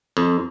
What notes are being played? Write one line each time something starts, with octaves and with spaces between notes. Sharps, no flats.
F2